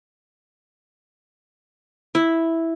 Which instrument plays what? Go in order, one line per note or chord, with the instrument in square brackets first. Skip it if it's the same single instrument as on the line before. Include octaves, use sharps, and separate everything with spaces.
[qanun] E4